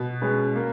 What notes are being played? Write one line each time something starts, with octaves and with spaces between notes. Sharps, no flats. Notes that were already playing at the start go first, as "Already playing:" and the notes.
Already playing: B2
G#3 C#4 G#4 B4
A#3